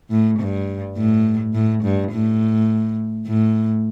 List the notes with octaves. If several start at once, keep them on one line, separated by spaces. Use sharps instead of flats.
A2
G2
A2
A2
G2
A2
A2